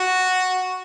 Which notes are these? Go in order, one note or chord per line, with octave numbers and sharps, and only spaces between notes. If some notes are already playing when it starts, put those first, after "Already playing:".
Already playing: F#4